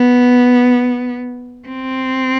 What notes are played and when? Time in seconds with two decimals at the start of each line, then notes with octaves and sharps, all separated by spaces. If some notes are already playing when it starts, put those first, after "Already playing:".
Already playing: B3
1.68 C4